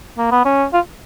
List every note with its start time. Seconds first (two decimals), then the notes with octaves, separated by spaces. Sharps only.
0.18 A#3
0.31 B3
0.45 C#4
0.73 F4